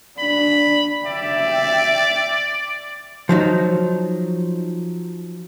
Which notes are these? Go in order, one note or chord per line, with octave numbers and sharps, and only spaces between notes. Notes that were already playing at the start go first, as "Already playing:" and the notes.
D4 B5
D5 E5 G5
F3 F#3 D#4